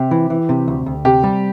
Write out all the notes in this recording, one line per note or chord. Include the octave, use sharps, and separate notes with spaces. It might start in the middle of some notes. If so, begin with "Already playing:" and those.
Already playing: C3 G4
E3
E3
C3
D2
D2
C3 G4
G3